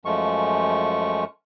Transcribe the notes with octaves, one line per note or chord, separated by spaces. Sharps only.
F#2 F3 G#3 A3 F4 C#6